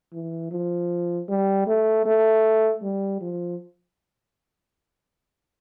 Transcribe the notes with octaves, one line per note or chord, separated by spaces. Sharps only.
E3
F3
G3
A3
A3
G3
F3